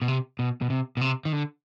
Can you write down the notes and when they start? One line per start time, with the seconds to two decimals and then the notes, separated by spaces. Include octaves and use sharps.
0.02 B2
0.08 C3
0.39 B2
0.62 B2
0.70 C3
0.97 B2
1.01 C3
1.25 D#3
1.33 D3